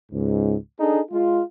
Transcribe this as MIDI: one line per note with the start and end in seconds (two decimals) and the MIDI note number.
0.12 0.54 37
0.12 0.54 44
0.80 1.01 62
0.80 1.01 63
0.80 1.01 68
0.80 1.01 69
1.11 1.40 56
1.11 1.40 65